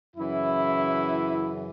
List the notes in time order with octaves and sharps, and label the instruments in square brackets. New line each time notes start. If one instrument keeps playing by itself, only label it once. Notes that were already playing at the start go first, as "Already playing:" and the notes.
[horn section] F#2 C#3 E3 E4